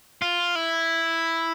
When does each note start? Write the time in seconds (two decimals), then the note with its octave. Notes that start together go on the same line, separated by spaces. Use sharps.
0.22 F4
0.55 E4